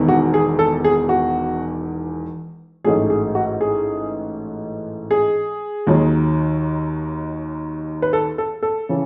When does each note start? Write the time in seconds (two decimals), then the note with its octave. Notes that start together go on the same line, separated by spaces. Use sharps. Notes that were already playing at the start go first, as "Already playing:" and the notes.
Already playing: E1 E2 D#3
0.08 F#4
0.34 G#4
0.59 A4
0.84 G#4
1.09 F#4
2.84 A1 G#2 F#3 A3 G#4
3.10 G#4
3.35 F#4
3.61 G#4
5.11 G#4
5.87 D#2 D#3 F#3
8.02 B4
8.13 A4
8.38 A4
8.62 A4
8.89 C#3 E3